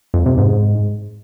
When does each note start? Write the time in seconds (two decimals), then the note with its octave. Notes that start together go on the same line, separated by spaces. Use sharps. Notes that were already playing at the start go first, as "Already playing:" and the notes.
0.14 F2
0.26 C3
0.38 G#2